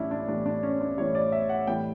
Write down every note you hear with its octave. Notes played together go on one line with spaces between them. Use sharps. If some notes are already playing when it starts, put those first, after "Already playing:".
Already playing: A2 E3 G3 C#4 D4 E4
D4
A2 E3 G3 D4
D4
C#4
D4
A2 E3 G3 C#5
D5
E5
F#5
A2 E3 G3 G5